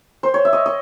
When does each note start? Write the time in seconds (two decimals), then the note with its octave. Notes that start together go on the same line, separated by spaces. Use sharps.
0.23 C5
0.34 C#5
0.45 E5
0.53 D#5
0.66 D#5